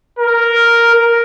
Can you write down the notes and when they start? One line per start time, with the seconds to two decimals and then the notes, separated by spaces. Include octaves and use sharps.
0.19 A#4
0.95 A#4